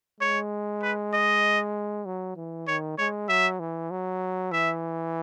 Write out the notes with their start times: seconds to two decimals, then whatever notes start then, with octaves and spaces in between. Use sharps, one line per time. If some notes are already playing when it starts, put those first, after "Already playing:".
0.20 G#3 C#5
0.82 B4
1.13 D#5
2.05 F#3
2.36 E3
2.67 D#3 C#5
2.98 G#3 C#5
3.29 F#3 E5
3.60 E3
3.91 F#3
4.52 E3 E5